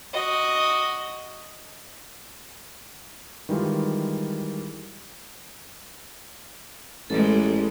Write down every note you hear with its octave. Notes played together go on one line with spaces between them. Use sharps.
F#4 D#5
D#3 E3 G3 G#3 F4
A1 E3 G3 G#3 A4